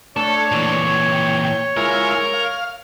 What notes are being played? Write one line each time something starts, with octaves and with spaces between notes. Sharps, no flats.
A3 D4 A4 C#5
A#2 E3
G5
G#3 E4 F4 A#4
F5